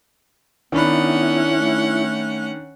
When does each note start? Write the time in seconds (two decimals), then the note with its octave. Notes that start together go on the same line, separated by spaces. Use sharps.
0.72 D#3 B3 C#4 D4 E4 F#5 B5
1.57 A3